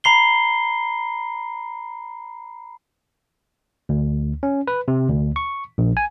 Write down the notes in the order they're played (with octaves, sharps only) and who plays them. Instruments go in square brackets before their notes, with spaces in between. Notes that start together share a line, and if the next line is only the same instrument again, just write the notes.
[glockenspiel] A#5 B5 C7 G7
[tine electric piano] D2
C#4
B4
C3
D2
C#6
A#1
G#5